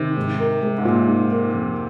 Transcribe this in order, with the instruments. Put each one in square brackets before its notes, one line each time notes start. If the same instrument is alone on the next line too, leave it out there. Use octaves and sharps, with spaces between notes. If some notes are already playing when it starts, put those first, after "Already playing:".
Already playing: [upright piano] C3 [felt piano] D#3
[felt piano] G#2
A#4
G#3
[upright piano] G#2
[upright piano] A#2 [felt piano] F4
[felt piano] G#2
A#4
F2